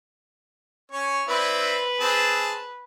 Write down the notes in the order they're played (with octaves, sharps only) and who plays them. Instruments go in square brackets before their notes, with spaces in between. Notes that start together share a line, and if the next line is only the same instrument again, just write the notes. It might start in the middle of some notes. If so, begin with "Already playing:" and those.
[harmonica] C#4 C#5
[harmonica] C4 E4 D5 [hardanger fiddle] B4
[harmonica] C4 G#4 A5